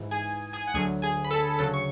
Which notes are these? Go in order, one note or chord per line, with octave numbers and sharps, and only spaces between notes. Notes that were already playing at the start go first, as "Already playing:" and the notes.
Already playing: G#2 E3
G#4 G#5
G#4 G#5
F#5
D2 D3 F#3 G#4 G#5
G#4 G#5
B5
A4 A5
D2 C#3 F#3 A4 A5
C#6